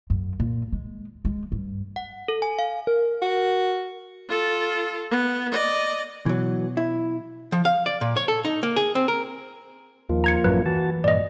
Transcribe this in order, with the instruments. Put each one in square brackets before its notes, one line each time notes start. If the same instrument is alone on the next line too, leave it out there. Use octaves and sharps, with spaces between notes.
[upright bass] F#2
A#2
G#3
G#3
G2
[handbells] F#5
A4
G#5
F5
[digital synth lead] A#4
[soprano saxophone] F#4
[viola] F4 A4
B3
D5 D#5
[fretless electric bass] B2 [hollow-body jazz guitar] E3 F#3
[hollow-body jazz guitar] E4
F3
F5
D5
A#2
C#5
A4
D#4
A#3
G#4
C4
A#4
[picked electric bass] D#2 [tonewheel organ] F3 A#3 F4
[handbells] A#5 G#6 C#7
[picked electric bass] A1 F#2 F#3 [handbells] B4
[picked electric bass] E3 [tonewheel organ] F#4 A5
[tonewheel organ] G2 A#2 [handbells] D5 D#5